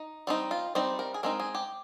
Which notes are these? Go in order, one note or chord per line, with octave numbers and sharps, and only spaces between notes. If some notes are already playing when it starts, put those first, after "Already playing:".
Already playing: D#4
G3 C4 D#4
F4
G3 C4 D#4 C5
A#4
G#4
G#3 C4 D#4 A#4
G#4
G4